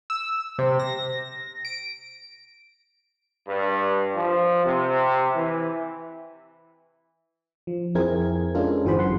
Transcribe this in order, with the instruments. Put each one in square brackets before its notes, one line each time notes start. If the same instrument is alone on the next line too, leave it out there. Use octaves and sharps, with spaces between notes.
[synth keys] E6
C3
A#6
D7
[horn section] G2
F3
C3
E3
[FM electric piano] F3
F2 C4 E4 G#4 A#4 G#6
G#3 C#4 D4 F4 A4 A#4
G1 E3 F#4 G#4 C5 B5
F#2 F#5 C6